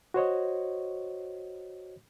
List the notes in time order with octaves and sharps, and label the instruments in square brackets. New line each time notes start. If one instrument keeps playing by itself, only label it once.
[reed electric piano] F#4 C5 C#5 D#5